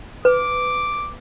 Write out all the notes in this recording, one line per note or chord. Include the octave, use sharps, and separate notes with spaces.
B4 D6